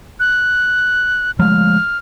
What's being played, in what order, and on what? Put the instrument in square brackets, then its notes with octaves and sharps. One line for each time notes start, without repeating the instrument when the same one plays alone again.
[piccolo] F#6
[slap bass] F3 G#3 A3 [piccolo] F6